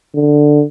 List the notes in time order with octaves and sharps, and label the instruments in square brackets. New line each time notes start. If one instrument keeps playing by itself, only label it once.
[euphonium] D3